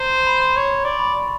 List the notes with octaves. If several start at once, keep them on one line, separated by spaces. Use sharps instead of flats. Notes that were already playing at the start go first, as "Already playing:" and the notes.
Already playing: C5 A#5
B5
C6
C#5 C6
D5 C#6
B5